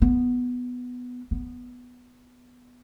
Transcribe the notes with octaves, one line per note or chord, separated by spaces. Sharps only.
B3
B3